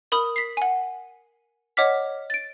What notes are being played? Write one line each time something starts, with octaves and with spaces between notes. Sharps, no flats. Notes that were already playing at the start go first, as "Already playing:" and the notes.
A#4 B5 D#6
B6 C7
F#5 G#5
C#5 D#5 F#5 D6 F6 B6
A6 D7